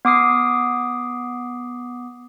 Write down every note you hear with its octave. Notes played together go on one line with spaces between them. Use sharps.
B3 D6 D#6 C7